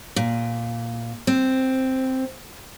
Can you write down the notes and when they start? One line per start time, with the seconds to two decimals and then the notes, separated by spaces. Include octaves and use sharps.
0.16 A#2
1.27 C4